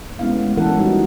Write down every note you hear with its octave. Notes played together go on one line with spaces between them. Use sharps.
G#3 A3 B3 C#4 E4 F5
G#3
E3 C#4 E4 A4 A#4 F#5
G3 G#3 D#4 F#4